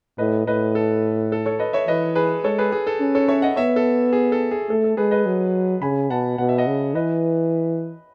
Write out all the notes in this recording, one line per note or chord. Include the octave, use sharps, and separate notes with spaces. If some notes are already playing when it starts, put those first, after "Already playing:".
A2 B4 D#5
A2 B4 D#5
A4
A4
A4 C#5
B4 D#5
C#5 E5
E3 B4 D#5
G#4 B4
G#3 A4 C#5
G#4 B4
G#4
A4
C#4
A4 C#5
C#5 E5
D#5 F#5
B3 C#5 E5
A4
G#4
A4
G#4
A3 A4
A4
G#3 G#4 B4
B4 D#5
F#3
C#3 G#5 B5
B2 F#5 A5
B2 F#5
E5
D#5 F#5
C#3
E3 B4 D#5